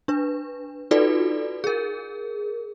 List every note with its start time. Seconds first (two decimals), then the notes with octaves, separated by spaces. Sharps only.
0.08 D4 B4
0.91 D#4 F4 F#4 A4 B4 D5
1.64 G#4 A#4